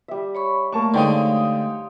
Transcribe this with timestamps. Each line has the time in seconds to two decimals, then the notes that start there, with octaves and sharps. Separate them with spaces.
0.08 G3 E5
0.35 C#5 B5 C#6
0.73 A3 A#3 A5 C#6
0.94 D3 G#3 C4 D#4 C#5 F5 G5 D#6